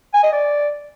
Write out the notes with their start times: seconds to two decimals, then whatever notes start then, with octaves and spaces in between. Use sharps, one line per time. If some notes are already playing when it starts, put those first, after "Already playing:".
0.14 G#5
0.23 D#5
0.33 D5